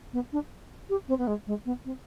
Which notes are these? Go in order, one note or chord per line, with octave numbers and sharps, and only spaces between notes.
B3
D4
G4
C4
B3
G#3
G#3
B3
C4